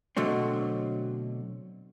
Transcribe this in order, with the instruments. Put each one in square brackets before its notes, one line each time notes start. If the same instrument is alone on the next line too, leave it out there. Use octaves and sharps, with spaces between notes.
[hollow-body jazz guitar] B2 D3 F#3 A3 C4